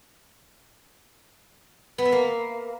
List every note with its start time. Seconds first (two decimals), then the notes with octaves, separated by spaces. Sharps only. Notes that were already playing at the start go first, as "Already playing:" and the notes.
1.98 B3
2.05 E5
2.12 A#3